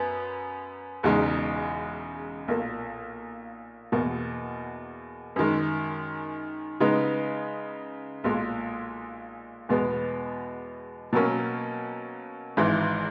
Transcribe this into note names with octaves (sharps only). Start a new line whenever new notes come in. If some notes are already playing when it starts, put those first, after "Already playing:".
Already playing: F#2 B3
E1 E2 C#3 G#3 D#4
B1 A#2 A#3
E2 B2 A#3
F#2 D#3 G#3
C#3 G#3 B3 D#4
B1 A#2 G#3
E2 B2 G#3 B3
B2 F#3 A#3 C#4
G#1 G#2 E3 G#3